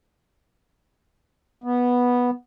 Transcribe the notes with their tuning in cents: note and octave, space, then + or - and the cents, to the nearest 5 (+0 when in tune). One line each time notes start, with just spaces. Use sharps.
B3 -10